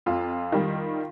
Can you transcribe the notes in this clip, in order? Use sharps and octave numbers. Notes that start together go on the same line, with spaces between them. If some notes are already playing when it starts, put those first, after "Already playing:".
F2 F4
D#3 G3